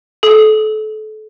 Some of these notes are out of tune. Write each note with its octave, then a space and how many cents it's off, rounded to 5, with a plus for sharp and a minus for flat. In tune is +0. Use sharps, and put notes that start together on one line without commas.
A4 -30 D#6 +0